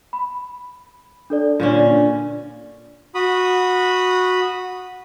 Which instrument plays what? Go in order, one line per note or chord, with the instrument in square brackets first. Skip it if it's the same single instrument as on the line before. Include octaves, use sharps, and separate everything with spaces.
[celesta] B5
D4 A4 D5
[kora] A#2 D3 C#4
[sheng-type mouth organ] F#4 B5 D#6